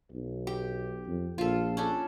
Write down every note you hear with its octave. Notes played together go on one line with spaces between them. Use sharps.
B1
G4
F2
A#1 F4 A4
C#4 D4 A4